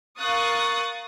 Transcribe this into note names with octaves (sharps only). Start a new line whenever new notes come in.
A#4 F5 C#6 D#6 F#6 A6